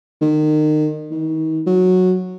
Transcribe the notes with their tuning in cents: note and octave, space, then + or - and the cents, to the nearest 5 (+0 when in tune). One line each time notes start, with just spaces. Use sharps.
D#3 -30
D#3 +35
F#3 -10